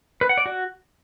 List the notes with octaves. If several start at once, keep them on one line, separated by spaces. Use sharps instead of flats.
B4
F#5
D5
F#4